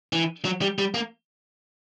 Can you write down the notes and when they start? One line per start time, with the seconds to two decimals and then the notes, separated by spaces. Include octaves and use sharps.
0.13 E3
0.45 F#3
0.61 G3
0.78 G3
0.94 A#3